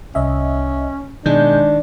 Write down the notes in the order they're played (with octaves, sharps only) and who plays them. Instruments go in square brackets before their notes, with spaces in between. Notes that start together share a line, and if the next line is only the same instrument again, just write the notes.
[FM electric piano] C2 D#5 E5 [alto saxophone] C#4
[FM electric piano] B2 G6 [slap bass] D#3 [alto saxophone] G#3 [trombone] D4